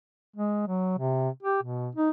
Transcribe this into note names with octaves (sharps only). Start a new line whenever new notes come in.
G#3
F#3
C3
G4
B2
D#4